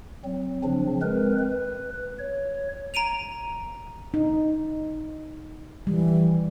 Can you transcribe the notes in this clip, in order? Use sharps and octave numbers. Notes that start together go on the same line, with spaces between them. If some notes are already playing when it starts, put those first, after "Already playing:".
F#3 C4
C#3 F3 C4 D4
G#3 C4 A#4 B4
B4
C#5
A#5 D7 D#7 F7
D#4
E3 G3